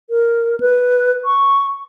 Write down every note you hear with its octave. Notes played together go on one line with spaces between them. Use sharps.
A#4
B4
C#6